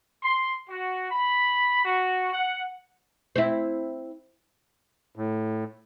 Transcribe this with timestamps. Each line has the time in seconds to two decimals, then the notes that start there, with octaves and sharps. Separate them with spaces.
0.23 C6
0.70 F#4
1.11 B5
1.85 F#4
2.34 F#5
3.36 C4 E4
5.16 A2